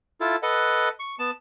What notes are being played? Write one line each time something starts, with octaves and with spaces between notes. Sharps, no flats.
E4 F4 A4
A4 B4 D#5 F#5
C#6
B3 A5